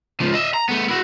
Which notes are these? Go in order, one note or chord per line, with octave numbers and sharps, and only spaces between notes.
C#2 F3
D#5 E5
A#5
A3 B3
E4 F#4